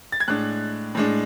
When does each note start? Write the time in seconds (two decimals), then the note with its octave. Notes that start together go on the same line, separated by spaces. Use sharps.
0.12 A6
0.20 G#6
0.28 A2 G#3 D4 F#6
0.95 A2 G#3 D4